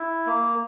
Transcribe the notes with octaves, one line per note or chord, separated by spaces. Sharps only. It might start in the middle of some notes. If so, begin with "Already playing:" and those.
Already playing: E4
A#3